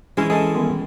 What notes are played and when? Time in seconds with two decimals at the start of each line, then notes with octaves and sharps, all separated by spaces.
0.17 E3 G#3 C#4 E4
0.30 E3 G#4 A4 D#5 A5
0.55 D#3 G3 B3